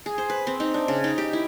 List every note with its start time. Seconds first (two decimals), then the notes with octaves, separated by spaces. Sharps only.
0.06 G#4
0.18 C5
0.30 B4
0.47 C4
0.60 D#4
0.74 D4
0.88 C#3
1.04 D#4
1.18 G4
1.33 E4